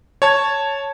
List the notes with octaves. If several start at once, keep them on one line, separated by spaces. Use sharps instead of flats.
C#5 A5 G#6